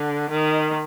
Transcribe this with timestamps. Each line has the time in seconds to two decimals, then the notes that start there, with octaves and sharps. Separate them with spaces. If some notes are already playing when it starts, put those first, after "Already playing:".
Already playing: D3
0.30 D#3